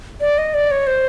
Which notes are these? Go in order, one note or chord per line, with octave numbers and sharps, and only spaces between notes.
D5
D#5
D5
C#5
C5